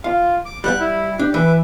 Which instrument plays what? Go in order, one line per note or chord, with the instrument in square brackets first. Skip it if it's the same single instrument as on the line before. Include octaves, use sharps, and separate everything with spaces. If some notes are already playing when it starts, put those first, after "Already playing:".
[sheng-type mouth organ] F4 [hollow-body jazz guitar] F5
[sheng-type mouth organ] D6
[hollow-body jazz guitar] G3 F#5 G5 [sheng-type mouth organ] F#6
[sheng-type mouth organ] E4
[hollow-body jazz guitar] D4 [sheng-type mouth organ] G4
[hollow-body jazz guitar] E3 [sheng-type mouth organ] B4 E5 D6